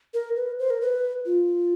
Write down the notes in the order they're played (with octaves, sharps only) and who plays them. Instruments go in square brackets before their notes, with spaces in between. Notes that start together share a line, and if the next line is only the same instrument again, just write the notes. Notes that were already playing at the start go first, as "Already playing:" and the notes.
[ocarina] A#4
B4
C5
A#4
B4
F4